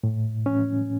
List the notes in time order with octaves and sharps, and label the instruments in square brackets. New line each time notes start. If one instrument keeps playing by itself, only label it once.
[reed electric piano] A2
C#4